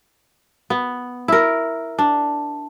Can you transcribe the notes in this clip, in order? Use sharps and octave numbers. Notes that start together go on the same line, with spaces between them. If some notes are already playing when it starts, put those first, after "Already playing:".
B3
E4 A#4
D4